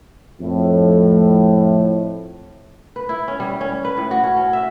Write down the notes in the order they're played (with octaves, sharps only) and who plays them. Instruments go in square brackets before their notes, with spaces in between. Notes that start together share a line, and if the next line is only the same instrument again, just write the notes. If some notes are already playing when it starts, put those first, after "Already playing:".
[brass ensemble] F2 A2
[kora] B4
E4
C#4
G3
C#4
B4
A2
F#4
C#4
C#4
E5